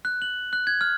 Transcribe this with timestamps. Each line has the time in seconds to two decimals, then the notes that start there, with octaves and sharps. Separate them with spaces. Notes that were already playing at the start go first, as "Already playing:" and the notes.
0.05 F#6
0.22 F#7
0.53 F#6
0.67 G#6
0.81 F6